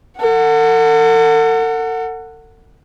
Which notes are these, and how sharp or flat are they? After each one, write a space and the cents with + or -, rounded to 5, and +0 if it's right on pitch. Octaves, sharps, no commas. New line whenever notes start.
A4 +45 F#5 -5